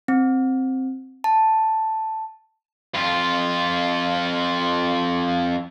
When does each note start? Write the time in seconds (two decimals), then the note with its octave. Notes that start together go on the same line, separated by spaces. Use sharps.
0.08 C4
1.24 A5
2.95 F2 F4